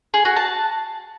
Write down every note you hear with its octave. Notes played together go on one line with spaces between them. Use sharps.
G#4
F#4
A5